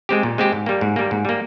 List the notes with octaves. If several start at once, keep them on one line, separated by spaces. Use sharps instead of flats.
G#3 C4 G4
A#2
G#3 C4 G4
G#2
G3 A#3
G#2
G3 A#3
G#2
G3 A#3